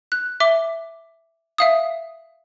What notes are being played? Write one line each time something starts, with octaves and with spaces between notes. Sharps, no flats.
F#6
E5 D6 G7
E5 F5 D#6